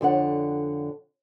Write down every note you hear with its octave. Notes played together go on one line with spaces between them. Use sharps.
F2 D3 C#5 F#5